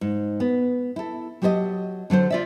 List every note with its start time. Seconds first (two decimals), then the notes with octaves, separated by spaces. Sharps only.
0.01 G#2
0.40 B3
0.96 E4 A4
1.42 F#3 G4 A4 B4 D#5
2.10 D3 F#3 A4 C5
2.30 F4 D5 E5